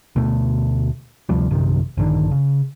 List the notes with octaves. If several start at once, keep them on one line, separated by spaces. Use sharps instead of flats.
D2 B2 A3
D2 C3 F3 G3
A#1 F#2 C3 D#3
A#1 G2 D3 D#3
C#3